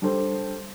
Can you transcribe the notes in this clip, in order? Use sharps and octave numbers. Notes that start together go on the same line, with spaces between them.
G3 D4 A4 C5